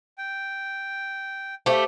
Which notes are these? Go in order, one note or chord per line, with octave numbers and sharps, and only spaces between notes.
G5
A3 G4 C5 F5